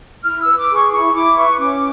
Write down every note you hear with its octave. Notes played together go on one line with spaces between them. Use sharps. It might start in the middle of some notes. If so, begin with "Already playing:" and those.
E4 F6
E6
B4
D6
G#4
C#6
E4 C#6
E4 D6
B4 C#6
C#4 D6